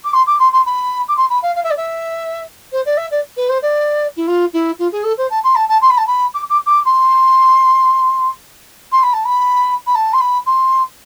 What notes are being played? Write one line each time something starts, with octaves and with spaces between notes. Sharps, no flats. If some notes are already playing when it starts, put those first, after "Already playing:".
D6
C6
D6
C6
C6
B5
D6
C6
B5
F5
F5
E5
D5
E5
C5
D5
E5
D5
B4
C5
D5
E4
F4
E4
F4
G#4
A4
C5
A5
C6
A5
A5
C6
B5
A5
B5
D6
D6
D6
C6
C6
B5
A5
B5
B5
A5
C6
B5
C6